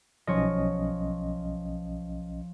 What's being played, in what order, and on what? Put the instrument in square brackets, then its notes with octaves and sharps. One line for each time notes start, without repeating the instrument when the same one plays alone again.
[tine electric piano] B1 C#4 D#5 [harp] F3 C#5